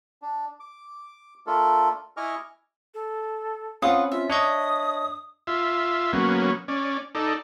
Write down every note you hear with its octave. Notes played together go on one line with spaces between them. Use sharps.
D4
D6
A3 D4 F4 A4 A#4
E4 D#5 G#5 C#6 D6 F6
A4
C4 C#4 F4 B4 F#5 D#6
F4 E5
D4 C#5 D#5 D#6
F4 E5
F#3 A#3 B3 C#4
C#4 D5
D#4 A4 D5